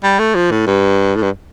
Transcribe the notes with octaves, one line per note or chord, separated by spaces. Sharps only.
G3
A3
F3
A2
G2
A2
G2